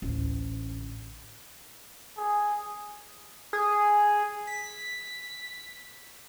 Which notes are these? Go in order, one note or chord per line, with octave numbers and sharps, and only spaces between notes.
A1 D2
G#4
G#4
B6